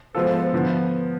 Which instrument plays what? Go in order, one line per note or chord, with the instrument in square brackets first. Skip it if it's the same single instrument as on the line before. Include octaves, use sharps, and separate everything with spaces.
[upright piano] F3 G#3 B3 F4 A4 [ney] C5
[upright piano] D3 F3 B3